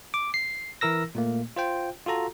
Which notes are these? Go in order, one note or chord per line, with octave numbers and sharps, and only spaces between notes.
D6
C7
E3 E4 A#4 E6 A#6
A#2 A3 A#3
F4 C5 G5
F4 F#4 A4 A#5